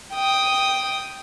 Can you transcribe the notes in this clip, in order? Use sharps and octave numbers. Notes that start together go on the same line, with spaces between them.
G5 D#6